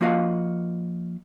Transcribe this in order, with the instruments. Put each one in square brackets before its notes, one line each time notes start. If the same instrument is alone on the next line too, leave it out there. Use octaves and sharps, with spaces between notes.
[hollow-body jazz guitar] F3 A#3 F4 F#4 D#5 F5